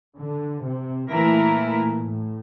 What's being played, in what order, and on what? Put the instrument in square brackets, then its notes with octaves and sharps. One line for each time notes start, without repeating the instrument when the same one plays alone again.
[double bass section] D3
C3
[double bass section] A#2 [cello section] E3 A3 E4 A#4
[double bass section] A2